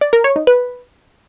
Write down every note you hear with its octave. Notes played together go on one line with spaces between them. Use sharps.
D5
A#4
C#5
D#4
B4